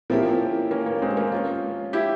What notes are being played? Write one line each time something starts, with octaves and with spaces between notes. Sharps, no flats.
F3 A#3 C4 C#4 E4 G4 A#4
A#3 C#4
A#3 C#4
G#3 C4
A#3 C#4
C#4 F4
E4 G4